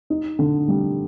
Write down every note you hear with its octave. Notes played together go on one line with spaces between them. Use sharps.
D#4
D3
G3